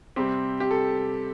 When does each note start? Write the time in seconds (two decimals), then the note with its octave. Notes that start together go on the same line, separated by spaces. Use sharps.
0.16 C3 G3 C4 G4
0.60 G4
0.71 A4